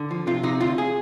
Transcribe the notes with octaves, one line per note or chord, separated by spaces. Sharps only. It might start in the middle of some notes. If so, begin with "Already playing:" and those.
Already playing: D3
F3
C3 F4
C3 D#4
D2 F4
G#4